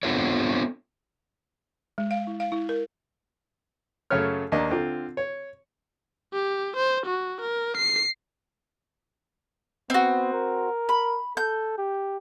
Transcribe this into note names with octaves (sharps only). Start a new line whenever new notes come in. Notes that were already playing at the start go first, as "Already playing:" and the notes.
B3 C4 D4 F4 A4 C#5
G#3
F5
E4
F5
E4
A#4
F#2 C#3 A3 C#5 F6
D#2 A#3 D4 D#5
D3 C4 F4
C#5
G4
C5
F#4
A#4
C7
B3 C4 F#4
A#4
B5
A4 G6
G4